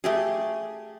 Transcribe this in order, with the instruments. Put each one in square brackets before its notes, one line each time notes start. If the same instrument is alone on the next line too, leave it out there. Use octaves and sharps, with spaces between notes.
[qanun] A3 G4 G#4